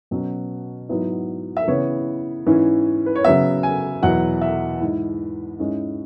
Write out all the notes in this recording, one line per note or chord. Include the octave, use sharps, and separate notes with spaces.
B2 F#3 C#4
G#2 F#3 B3 E4
E5
C#3 E3 B3 E4 C#5
G#2 E3 C#4 E4
B4
C#5
C#3 F#3 B3 E5
G#5
E2 B2 F#3 E4 F#5
E5
G#2 G#3 E4
G#2 G#3 C#4 E4